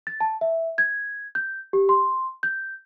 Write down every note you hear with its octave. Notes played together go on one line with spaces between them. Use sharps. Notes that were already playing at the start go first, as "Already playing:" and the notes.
A6
A5
E5
G#6
G6
G4
C6
G6